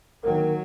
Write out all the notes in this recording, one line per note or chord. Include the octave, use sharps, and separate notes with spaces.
D#3 F#3 A#3